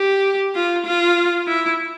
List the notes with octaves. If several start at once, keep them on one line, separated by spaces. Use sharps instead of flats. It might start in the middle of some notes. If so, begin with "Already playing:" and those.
Already playing: G4
F4
F4
E4